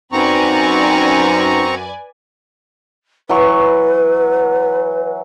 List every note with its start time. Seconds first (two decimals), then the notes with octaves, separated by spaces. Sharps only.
0.12 F#2 C4 D#4 B4 D5 G#5 A#5 C#6
3.29 E3 F#3 B4 C#6